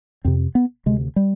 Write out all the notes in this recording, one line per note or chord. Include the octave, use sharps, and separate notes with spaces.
F2 C3 C4
B3
D2 C3 G#3
G3